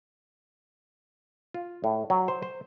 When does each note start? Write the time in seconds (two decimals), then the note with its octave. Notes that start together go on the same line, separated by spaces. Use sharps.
1.54 F4
1.84 A2
2.10 F#3
2.28 C5
2.42 C5